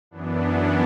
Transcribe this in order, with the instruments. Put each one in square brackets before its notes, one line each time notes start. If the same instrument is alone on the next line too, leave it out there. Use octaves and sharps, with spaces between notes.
[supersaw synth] F#2 E3 B3 D4